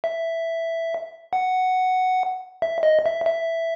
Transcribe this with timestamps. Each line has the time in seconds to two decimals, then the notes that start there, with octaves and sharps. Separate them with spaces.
0.04 E5
1.33 F#5
2.62 E5
2.83 D#5
3.06 E5
3.26 E5